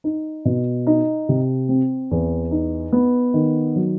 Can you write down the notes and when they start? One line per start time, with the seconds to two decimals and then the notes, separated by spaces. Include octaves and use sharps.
0.04 D#4
0.45 B2
0.87 D#4
1.29 C3
1.69 C4
2.11 E2
2.51 D#4
2.92 B3
3.34 D#3
3.76 F#3